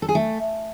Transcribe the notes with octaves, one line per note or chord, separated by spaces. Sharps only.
A4
G#4
A3